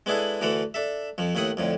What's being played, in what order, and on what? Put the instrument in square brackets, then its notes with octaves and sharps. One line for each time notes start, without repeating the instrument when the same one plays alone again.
[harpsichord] G#3 B3 D4 E4 G#4 A4
D2 D3 E3 A4 F#5
D4 A4 E5
F2 F3
D#2 A2 E4 F#5 D#6
F2 A2 D3